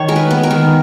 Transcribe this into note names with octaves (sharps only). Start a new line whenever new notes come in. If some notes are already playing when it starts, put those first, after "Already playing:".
Already playing: D#3 C#5
G#3 A#4
B4
B3
A#4
D#3